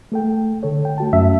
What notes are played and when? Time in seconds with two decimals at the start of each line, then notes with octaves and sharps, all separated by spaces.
0.12 A3 A4 G5
0.63 D3 A4 C#5
0.85 G5
0.98 A3 F#4 A5
1.13 F#2 E5